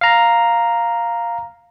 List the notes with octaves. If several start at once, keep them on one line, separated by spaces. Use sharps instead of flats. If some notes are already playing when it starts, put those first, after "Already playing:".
F5 A#5